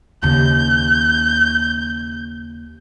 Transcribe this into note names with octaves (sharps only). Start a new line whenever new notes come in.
D#2 C#3 G6